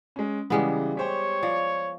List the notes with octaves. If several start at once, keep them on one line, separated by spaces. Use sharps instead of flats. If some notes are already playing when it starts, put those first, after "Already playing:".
G#3 C#4
C#3 E3 G3 G#3 B3
G4 C5 C#5 G5
F3 D5